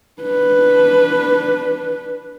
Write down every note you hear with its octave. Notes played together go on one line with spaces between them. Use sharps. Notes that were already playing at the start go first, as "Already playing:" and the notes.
D4 B4